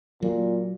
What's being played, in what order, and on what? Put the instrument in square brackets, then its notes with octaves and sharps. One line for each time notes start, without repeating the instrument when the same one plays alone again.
[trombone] A#2 [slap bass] F#3